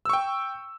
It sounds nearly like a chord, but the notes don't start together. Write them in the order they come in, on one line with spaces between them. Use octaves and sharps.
E6 C#6 G5